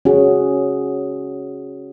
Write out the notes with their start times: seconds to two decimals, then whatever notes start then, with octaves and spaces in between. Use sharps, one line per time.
0.05 C#4 F#4 G#4